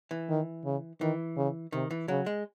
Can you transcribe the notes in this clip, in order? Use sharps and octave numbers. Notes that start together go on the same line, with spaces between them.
E3
D#3
C#3
D#3 E3
C#3
C3 D#3
E3
C#3 F#3
G#3